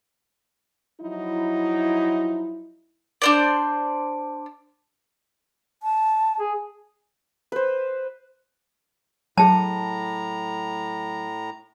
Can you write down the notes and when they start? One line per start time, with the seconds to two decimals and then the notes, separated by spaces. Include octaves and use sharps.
1.01 F3 F#3 D#4 E4
3.22 D4 C5 D5
5.83 A5
6.40 G#4
7.52 B4 C5
9.38 A2 F#3 G#4 A5 A#5